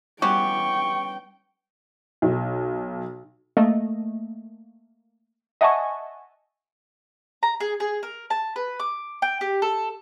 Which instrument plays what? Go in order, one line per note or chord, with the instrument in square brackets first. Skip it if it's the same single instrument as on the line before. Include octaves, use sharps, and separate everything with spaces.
[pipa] E3 F#4 G4 [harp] G3 B3 C#4 [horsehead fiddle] G5 [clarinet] C#6
[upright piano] B1
[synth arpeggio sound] A3 A#3 D#5
D#5 E5 F#5 G#5 A5 C#6
[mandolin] A#5
G#4
G#4
A#4
A5
B4
D6
G5
G4
A4